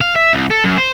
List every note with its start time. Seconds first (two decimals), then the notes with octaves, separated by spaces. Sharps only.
0.01 F5
0.16 E5
0.33 C2
0.50 A4
0.64 F#2
0.77 C5